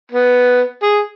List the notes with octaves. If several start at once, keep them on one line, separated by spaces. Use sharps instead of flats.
B3
G#4